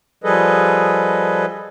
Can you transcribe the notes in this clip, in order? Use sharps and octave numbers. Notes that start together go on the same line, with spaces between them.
F3 G3 G#4 A4 B4 D#5